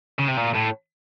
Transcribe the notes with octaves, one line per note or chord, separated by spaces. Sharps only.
C#3
C3
A#2
A2